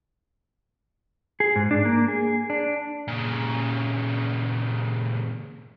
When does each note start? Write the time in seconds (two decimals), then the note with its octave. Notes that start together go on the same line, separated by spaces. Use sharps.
1.40 G#4
1.56 G#2
1.71 D4
1.85 A#3
2.08 G#4
2.50 D4
3.08 A#2 C#3